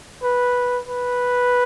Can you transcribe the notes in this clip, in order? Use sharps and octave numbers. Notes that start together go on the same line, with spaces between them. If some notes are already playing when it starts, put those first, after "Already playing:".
B4
B4